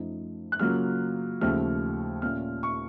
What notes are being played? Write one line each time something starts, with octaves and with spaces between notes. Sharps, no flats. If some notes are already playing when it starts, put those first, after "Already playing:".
Already playing: F#2 F3 A3 D#4
F#6
C#3 F#3 A#3 F4 F6
D#2 C#3 F3 A3 F6
A#2 A3 C#4 F4 F6
C#6